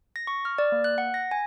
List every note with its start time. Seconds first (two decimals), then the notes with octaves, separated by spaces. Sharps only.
0.16 A#6
0.27 C#6
0.45 F6
0.58 D5
0.72 A#3
0.84 F#6
0.98 F#5
1.14 A#6
1.31 G#5